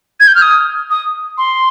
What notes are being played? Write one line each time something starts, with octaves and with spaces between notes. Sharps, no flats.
G#6
G6
F6
D#6
D#6
C6